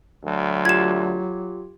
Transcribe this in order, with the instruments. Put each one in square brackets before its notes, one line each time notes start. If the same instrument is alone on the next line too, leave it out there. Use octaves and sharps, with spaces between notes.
[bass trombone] D2 [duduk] F#3
[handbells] F4 G4 [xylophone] G#6 E7